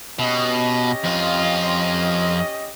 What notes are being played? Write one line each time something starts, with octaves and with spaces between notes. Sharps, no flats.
B2 C#4 G4 D#5
F2 F4